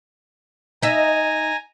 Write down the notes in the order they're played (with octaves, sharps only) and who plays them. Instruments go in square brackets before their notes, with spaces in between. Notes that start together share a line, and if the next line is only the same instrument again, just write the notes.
[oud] D#4 E5 [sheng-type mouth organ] G#5 A#5